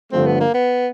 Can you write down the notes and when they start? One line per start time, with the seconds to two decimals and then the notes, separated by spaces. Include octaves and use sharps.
0.12 G2 D3 F3 A3 C4
0.26 B3
0.40 A#3
0.54 B3